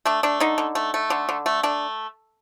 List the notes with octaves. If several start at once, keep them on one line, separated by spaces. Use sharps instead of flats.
A3 D4
A3 D4
D3 D#4
D3
A3
A3
D3
D3
A3
A3 D4